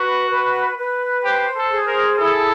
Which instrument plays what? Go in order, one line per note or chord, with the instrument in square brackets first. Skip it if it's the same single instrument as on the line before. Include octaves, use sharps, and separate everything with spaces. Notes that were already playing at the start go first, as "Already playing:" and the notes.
Already playing: [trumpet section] F#4 [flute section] B4
[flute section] B4
B4
[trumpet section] G4 [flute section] C5
[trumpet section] A4
[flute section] G#4
[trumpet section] A#4
[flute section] E4 [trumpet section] A4